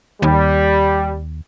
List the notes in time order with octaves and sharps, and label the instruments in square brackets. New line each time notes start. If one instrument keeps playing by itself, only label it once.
[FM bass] D#2 [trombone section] G3